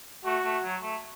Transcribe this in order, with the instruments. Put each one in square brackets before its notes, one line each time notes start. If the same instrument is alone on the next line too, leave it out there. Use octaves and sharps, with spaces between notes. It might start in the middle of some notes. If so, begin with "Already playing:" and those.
[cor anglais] A3 [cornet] F#4
[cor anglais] A3
F#3
A3